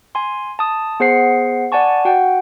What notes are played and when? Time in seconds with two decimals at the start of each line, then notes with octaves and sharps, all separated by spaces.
0.15 G#5 C6
0.59 A5 D#6
1.00 B3 G#4 C5 F#5 C7 C#7
1.72 D5 F#5 G#5 A5 C#6
2.05 F#4 F#5 G5